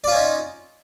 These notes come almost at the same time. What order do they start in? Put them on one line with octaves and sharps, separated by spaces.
D5 F4 C#4 D#4